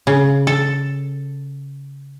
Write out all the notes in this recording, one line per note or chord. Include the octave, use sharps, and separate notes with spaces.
C#3
A4